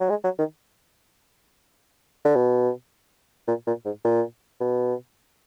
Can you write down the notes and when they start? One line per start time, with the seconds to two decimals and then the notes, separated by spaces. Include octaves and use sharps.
0.01 F#3
0.10 G#3
0.24 F#3
0.39 D#3
2.25 D3
2.36 B2
3.48 A#2
3.67 A#2
3.85 G#2
4.05 A#2
4.60 B2